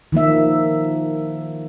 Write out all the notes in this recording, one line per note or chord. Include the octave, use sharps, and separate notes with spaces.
D#3 F3 A#3 E5